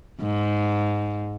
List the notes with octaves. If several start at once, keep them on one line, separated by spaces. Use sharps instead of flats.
G#2